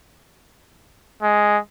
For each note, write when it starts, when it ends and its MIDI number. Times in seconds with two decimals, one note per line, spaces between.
1.22 1.58 56